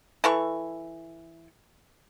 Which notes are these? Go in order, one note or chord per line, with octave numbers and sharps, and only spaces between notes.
E3 A4 C#6